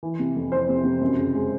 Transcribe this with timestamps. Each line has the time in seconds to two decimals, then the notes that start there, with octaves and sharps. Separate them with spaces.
0.03 E3
0.19 C3
0.36 F2
0.52 F2 C5
0.69 C3
0.85 C3
1.01 F#2
1.17 C#3
1.35 G#3